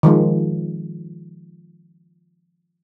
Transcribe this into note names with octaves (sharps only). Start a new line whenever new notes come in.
D#3 F3 G#3